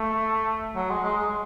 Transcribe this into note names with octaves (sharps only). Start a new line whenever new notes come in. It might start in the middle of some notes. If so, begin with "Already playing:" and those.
Already playing: A3
F#3
G#3
G#3
G#3